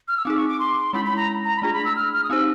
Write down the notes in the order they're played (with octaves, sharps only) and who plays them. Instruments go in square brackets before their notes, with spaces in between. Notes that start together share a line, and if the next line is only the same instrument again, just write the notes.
[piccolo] F6
E6
[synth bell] C4 D#4 G#4 [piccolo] D6
[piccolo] C#6
D6
C6
[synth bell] G#3 C#4 E4 [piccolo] B5
[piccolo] B5
A#5
A#5
B5
[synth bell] A3 D4 F4 G#4 [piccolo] A#5
[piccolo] B5
E6
F6
F6
D#6
[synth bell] C4 D#4 G4 C5 [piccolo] E6